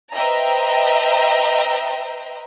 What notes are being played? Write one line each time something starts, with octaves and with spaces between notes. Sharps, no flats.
B4 C5 D#5 E5 G5 A#5